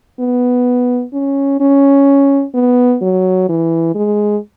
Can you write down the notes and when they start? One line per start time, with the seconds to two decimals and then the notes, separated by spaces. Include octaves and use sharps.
0.20 B3
1.13 C#4
1.60 C#4
2.54 B3
3.02 F#3
3.49 E3
3.95 G#3